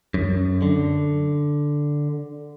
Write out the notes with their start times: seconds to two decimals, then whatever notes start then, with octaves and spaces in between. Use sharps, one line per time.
0.14 F#2
0.62 D3